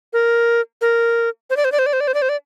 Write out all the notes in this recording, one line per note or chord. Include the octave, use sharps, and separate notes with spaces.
A#4
A#4
C5
D5
C5
D5
C5
D5
C5
D5
C5
D5
C5
D5